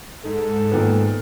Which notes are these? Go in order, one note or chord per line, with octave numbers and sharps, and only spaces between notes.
G#2 A4
A#2 D#3 B3